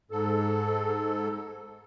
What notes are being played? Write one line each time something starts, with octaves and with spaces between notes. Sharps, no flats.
G#2 A4